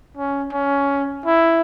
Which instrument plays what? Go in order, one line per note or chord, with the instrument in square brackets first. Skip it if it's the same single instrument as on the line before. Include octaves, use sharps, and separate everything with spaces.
[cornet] C#4
C#4
E4